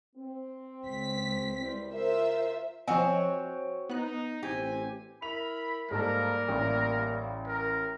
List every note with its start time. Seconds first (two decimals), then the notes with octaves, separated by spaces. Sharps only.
0.16 C4
0.85 C#2 B6
1.59 E3 G3 C4
1.91 F4 A#4 C5 E5
2.88 F3 C4 F#4 C#5 D#5 G#5
3.90 B3 D#4 F#6
4.43 A1 C4 G4 G#5
5.22 E4 A#4 B5 F7
5.91 G#2 G3 A#3 A4 A#4 A5
6.49 A1
7.47 A#4